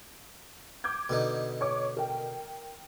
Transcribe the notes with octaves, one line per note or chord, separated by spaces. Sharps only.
D6 G6 G#6
B2 D3 D#4
C#5 D6
A#4 G5